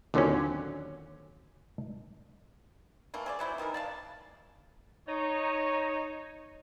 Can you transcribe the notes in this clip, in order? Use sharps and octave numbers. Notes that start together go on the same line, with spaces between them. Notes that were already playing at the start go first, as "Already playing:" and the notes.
D#2 A#2 D3 F#3 C4 C#4
E3 A3 A#3
G#4 C5 D5
E3 F#3 E4 C5
D#3 E3 G3 A#4
D5 F5 A5
D#4 C#5